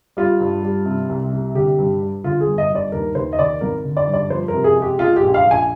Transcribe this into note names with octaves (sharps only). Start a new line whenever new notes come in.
G3 F4
G2
G3
C3
C2
C3
D3 G4
G2
G3
D3 F4
G#4
G1
D#5
G2
D5
D#2 A#4
D#2 C5
D#5
D#3 D5
G#1 A#4
D3
D5
G2
D5
F3 C5
A#4
C3
G#4
G#3
G4
G#3 F4
G4
A#1
F5
A#1
G#5